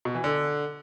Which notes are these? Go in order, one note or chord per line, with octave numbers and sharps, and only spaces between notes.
B2
E3
D3